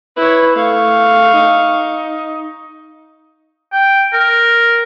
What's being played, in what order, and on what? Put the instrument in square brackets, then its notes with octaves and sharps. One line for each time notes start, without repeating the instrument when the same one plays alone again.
[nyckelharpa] E4 C#5 [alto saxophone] B4
[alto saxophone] A3 [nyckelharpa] F5 C#6
[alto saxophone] D#4
[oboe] G5
A#4